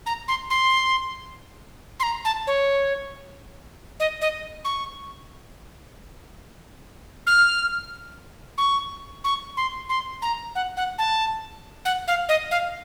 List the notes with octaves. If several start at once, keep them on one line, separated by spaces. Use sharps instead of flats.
A#5
C6
C6
C6
A#5
A5
C#5
D#5
D#5
C#6
F6
C#6
C#6
C6
C6
A#5
F#5
F#5
A5
F#5
F5
D#5
F5